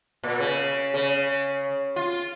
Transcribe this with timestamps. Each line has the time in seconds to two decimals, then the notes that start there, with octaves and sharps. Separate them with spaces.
0.23 A#2
0.40 C#3
0.94 C#3
1.96 F4